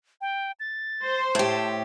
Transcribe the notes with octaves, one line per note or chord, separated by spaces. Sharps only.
G5
A6
C5
A2 G4 A5